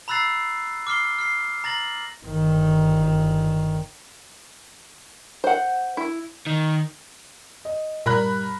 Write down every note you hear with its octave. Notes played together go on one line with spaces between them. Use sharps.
A#5 B5 E6 F#6 A6 C7
D6 F6 C7 G7
F6 C7
A#5 A6 A#6 F#7
G1 D#3
C5 F#5
E4
D#3
D#5
G2 A#2 A#4 B5 F#6